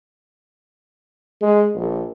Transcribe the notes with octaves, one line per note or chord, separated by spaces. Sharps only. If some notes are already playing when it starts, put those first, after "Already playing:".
G#3
A#1